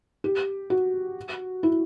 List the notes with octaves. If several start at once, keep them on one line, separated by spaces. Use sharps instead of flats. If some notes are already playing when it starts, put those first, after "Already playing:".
G4
F#4
E4